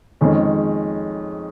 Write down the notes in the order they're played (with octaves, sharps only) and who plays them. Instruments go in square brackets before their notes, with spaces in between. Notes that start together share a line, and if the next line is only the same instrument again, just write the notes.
[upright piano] F2 D#3 G#3 C#4